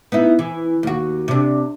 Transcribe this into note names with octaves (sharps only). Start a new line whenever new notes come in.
B3 D#4 E4
E3
D#2 F#4
C3 D4